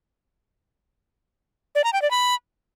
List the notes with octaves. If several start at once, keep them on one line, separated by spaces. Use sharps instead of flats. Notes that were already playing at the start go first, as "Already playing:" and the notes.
D5
A#5
G5
D5
B5